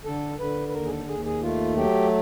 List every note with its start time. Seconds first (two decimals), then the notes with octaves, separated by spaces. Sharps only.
0.05 D3 A4
0.39 D3 B4
0.68 B4
0.73 D#2 A#4
0.85 G#4
0.91 A4
1.08 D#2 G#4
1.25 G#4
1.42 A3 F4
1.76 F#3 G4